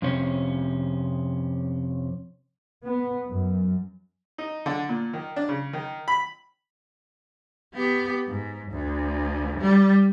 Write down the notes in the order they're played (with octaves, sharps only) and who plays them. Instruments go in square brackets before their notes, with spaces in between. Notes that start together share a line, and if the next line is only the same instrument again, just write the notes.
[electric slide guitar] F2 C3 C#4
[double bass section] B3
F#2
[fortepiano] D#4
D3
A#2
D#3
D4
C#3
D#3
B5
[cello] B3 G4
G#2
D2
G3